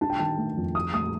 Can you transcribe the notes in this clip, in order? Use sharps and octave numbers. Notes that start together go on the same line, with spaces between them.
D4 A5
G5
D#3 A5
A3
F2
F4 D#6
A3 D#6